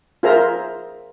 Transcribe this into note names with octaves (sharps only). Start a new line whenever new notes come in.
F4 G#4 A#4 C5 E5 A#5